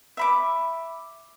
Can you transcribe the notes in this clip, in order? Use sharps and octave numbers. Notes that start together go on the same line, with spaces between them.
E5 B5 D6